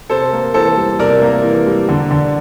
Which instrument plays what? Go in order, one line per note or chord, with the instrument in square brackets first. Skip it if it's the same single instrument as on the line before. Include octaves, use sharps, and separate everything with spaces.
[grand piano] C3 [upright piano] A4 C5
[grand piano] A#3
[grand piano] E3 [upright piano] A4 C5
[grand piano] G3
[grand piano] C3 [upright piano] A#4 D5
[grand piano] A#3
E3
G3
D3
D3